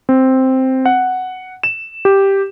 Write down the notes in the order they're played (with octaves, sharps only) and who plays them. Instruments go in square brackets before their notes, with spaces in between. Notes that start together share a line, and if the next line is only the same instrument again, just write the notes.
[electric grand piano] C4
F#5
E7
G4